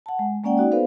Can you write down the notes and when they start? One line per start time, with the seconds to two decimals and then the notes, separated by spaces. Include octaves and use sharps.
0.06 F#5 A5
0.19 G#3
0.44 G#3 A#3 C#4 D5 F#5 G5
0.57 D#4 F#4 D5
0.72 B3 A4 B4 C5 F5